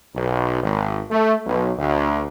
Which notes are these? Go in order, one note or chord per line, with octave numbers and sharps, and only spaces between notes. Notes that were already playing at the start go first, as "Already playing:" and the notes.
B1
G#1
A3
B1
D2